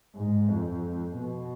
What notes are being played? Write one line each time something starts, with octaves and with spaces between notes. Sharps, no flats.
G#2
F2
B2